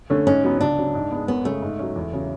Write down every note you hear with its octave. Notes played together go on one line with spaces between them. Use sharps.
D3 A3 C#4
G#2 C#4
F#3 B3
C#2 D4
C#3 F#3
G#2
G#3 B3
F#2 B3
C#3 G#3 A3 C#4 G#4
G#2
F#3 C#4
E2
C#3 F#3 C#4